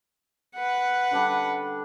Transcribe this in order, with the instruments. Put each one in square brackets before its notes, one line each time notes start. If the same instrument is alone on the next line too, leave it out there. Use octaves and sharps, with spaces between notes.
[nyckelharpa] B4 F#5
[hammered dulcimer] D3 G3 D4